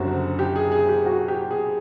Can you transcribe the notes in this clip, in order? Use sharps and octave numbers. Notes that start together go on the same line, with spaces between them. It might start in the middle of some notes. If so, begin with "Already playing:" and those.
Already playing: F#1 F#2 D3 G3 C4 F#4
G4
G#4
G#4
G4
F#4
G4
G#4